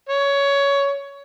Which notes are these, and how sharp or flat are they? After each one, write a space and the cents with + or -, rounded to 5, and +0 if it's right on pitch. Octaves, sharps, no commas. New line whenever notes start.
C#5 +15